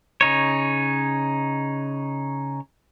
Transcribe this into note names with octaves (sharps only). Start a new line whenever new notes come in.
C#3 D#4 C#5